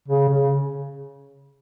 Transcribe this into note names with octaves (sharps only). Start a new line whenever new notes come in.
C#3
C#3